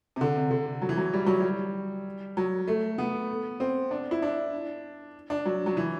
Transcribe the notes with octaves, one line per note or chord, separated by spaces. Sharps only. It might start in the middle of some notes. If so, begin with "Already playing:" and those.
C3
D3
C3
D3
F#3
E3
F#3
G3
F#3
G3
F#3
A3
B3
C4
D4
E4
D4
D4
F#3
F#3
E3